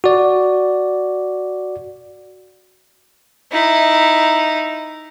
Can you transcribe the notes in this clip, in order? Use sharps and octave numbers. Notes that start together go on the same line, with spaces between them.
F#4 D5
D#4 E4